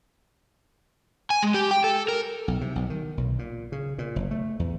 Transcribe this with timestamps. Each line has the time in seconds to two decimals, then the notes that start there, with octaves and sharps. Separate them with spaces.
1.30 G#5
1.43 G#3
1.54 G4
1.71 G5
1.84 A4
2.08 A#4
2.48 B1
2.61 C3
2.76 B1
2.90 D#3
3.17 B1
3.39 A#2
3.72 C#3
3.98 A#2
4.16 F#1
4.31 A3
4.59 E2